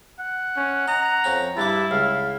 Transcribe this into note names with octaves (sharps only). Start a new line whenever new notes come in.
F#5
C#4
D#5 A#5
F2 C#4 G5
G2 G3 E4 A5 D6
C#2 F5